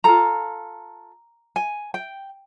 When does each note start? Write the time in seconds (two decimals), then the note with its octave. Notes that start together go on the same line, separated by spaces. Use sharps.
0.04 F4 A4 A#5
1.56 G#5
1.94 G5